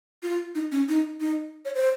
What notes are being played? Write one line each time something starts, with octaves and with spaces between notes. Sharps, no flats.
F4
D#4
C#4
D#4
D#4
C#5
C5